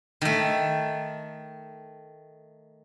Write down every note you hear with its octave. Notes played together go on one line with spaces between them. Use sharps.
D#3 A3